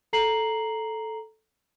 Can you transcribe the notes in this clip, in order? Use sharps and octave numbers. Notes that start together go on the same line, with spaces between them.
A4 A#5 C7 F#7